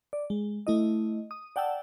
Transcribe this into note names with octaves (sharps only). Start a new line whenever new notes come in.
D5
G#3
A3 E4 D#5
D#6
D5 F#5 G5 A5 E6